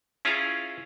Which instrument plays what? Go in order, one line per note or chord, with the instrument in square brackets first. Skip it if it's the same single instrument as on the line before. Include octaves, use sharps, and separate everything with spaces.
[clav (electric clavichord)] C#4 E4 F4 G#4 F5 A#5